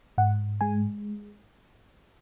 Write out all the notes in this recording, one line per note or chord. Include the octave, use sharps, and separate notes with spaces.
G#2 F#5
G#3 G#5